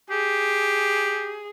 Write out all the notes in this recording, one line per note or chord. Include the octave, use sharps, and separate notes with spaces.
G4 G#4